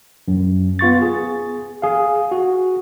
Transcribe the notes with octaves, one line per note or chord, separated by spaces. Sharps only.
F#2
B3 F4 C#6 A6
G#4
G#4 F5
F#4